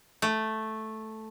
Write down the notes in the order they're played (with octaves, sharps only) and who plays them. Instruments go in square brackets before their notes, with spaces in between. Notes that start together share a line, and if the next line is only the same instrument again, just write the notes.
[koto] A3